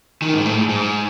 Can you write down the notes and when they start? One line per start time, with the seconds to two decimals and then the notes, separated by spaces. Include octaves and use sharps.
0.22 D#3
0.34 G#2
0.46 A2
0.57 G#2
0.69 G#2